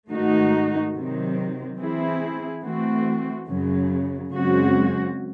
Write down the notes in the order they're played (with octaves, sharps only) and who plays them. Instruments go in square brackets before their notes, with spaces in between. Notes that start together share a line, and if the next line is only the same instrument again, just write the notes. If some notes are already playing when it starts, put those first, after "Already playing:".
[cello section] G#2 D#3 A3 D#4 F#4
C3 D#3 F#3 C4
E3 C4 E4 G#4
E3 A3 C4 F#4
F#2 C#3 F#3
F#2 C#3 G#3 C4 F#4